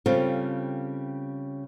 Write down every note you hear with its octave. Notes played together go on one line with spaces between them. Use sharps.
C#3 G3 C4 F4 A4